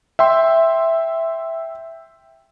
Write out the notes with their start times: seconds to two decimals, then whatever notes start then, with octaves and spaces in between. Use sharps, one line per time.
0.19 E5 G5 C6